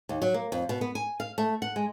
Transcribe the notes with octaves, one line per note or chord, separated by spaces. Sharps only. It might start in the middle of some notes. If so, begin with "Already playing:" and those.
D#2
F#3
A#3
F2
B2
B3
G#5
F5
A3
F#5
G#3